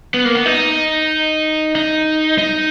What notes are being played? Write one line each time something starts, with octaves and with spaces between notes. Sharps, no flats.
B3
A#3
B3
D#4
D#4
D#4